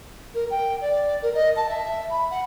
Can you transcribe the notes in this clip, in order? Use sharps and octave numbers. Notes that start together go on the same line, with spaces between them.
A#4
G5
D5
A#4
D#5
A5
E5
B5
F#5